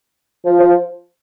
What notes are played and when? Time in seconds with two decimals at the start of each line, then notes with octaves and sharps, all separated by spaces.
0.45 F3
0.60 F3